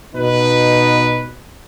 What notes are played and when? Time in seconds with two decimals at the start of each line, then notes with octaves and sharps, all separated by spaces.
0.15 B2 D#4 B4